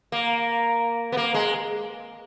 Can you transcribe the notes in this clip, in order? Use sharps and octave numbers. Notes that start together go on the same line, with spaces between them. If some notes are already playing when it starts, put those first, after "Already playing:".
A#3
B3
A#3
G#3